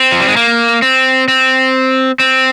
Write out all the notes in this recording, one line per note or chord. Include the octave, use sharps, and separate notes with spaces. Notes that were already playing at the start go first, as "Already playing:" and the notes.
Already playing: C4
F3
G3
G#3
A#3
C4
C4
C4